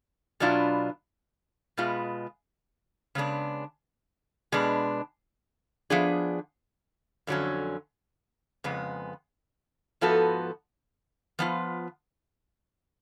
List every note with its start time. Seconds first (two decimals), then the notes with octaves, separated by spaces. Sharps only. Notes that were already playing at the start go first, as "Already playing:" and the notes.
0.40 B2 F#3 B3 D4 F4
1.77 B2 G#3 B3 F4
3.15 C#3 G#3 B3 D4
4.52 B2 G#3 B3 D4
5.90 F3 B3 D4 G#4
7.27 F2 D3 F#3 C#4
8.64 F2 C#3 G#3 B3
10.01 G#2 F3 B3 F#4 A4
11.39 F3 B3 F4